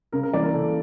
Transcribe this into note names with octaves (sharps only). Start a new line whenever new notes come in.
C#3 A#4
A#4
E3 A#3 D5
A#4
C#3 A4